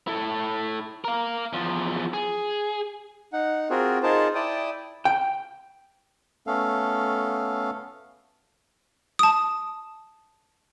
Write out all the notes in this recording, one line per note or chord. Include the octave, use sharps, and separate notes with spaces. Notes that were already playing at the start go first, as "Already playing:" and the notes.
E4 A4
A#4 F5
E2 F3
G#4
D#4 F#5
C4 F4 F#4 G#4 A#4
D#4 F4 G#4 A#4 C5 A5
E4 D5 G5 A5 D#6
G5
A3 B3 C#4 A4 F5
A5 D#6